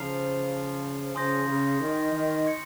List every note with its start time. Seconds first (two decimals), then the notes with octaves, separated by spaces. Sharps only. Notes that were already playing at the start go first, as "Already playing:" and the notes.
Already playing: C#3 F3 A#5 F6 C7 F7
1.14 C#3 F3 G#5 C6 D#6 G6 A#6
1.47 C#3
1.80 D#3
2.12 D#3
2.46 C#6 G#6 C#7